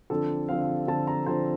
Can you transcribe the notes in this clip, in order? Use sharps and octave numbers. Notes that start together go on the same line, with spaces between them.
D3 F3 C4 A4
D3 F3 C4 F5
F5
D3 F3 C4 A5
A#5
D3 F3 C4 C5